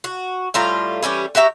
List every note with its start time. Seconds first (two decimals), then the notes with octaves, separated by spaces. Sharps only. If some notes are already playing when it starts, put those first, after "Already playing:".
0.04 F#4
0.54 A2 G3 F4 A#5
1.03 E3 G3 C#4 G4
1.35 F#4 G4 E5 A#5